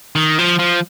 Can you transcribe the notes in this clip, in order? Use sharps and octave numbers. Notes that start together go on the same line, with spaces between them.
D#3
F3
F3